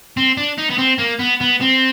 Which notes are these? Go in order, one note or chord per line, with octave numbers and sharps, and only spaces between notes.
C4
D4
D#4
B3
C4
A#3
B3
B3
C4